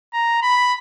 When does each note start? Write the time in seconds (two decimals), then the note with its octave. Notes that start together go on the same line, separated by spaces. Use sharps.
0.13 A#5
0.42 B5